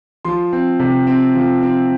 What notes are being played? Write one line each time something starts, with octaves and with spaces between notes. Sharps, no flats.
F3 C6
C4
C3
C4
F3
C4